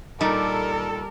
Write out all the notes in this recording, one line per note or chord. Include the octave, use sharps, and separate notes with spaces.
A#2 G3 D#4 A4 A#4